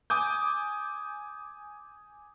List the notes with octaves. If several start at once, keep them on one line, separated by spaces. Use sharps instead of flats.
G#5 D6 D#6 G6